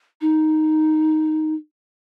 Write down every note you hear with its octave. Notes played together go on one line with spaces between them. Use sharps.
D#4